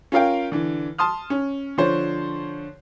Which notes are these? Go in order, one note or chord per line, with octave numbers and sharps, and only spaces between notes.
C#4 F4 A#4 F5 G5
D3 E3
A5 C6 D#6 F6
C#4
D3 F3 C5 C#5